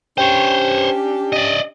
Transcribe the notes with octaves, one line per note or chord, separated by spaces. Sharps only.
C#4 D4 G4 C5 C#5 G5
D5 D#5